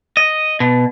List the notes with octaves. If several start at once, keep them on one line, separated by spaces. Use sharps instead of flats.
D#5
B2